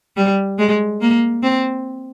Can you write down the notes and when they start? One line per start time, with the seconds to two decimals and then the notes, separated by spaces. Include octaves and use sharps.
0.17 G3
0.59 G#3
1.01 A#3
1.43 C4